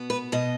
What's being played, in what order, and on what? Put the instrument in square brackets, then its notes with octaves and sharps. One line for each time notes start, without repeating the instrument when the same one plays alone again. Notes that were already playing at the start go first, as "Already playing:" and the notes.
Already playing: [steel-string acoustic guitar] B2 B3
B4
B2 D#5